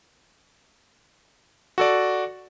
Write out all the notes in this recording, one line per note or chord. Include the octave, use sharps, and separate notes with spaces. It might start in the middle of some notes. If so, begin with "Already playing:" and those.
F#4 A4 D5